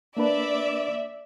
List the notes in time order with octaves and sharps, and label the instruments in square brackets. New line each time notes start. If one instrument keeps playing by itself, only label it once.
[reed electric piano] A#3 D4 B4 [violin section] D5 E5